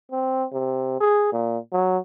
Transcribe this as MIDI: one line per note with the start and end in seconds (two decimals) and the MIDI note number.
0.12 0.45 60
0.53 1.00 48
1.00 1.29 68
1.32 1.58 46
1.73 1.98 54